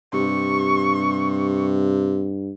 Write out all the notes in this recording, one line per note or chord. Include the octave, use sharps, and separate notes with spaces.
G2 C3 C#6